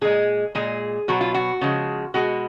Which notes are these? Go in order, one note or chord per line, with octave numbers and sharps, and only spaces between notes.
A#2 G#3 G#4
A#2 G#3 G#4
B2 F#3 F#4
F4
F#4
C#3 F3 G#3
B2 G#3 F#4